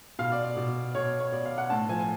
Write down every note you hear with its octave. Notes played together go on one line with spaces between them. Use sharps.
B2 F5
D5
D5
B2
B2 C#5
C#5
B2 D5
F5
F#5
A2 A5
F3 G#5
G#5